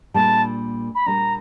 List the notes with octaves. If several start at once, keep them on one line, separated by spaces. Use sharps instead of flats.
A#2 G3 A#3 D4 A5
B5
A#2 G3 A#3 D4 A#5